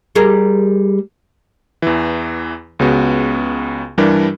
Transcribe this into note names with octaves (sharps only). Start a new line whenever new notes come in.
G3 G#4 A#4
E2 E3
C#2 C#3 B3 F#4
G2 E3 G3 D4 G4 A#4